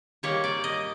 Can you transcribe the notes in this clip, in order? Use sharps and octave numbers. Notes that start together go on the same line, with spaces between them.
D#3 G3 A#3 C#5
D5
D#5